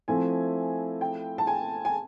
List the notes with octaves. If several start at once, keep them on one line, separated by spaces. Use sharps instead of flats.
F3 A3 C4 E4 G#5
G5
A5
G#5
G#5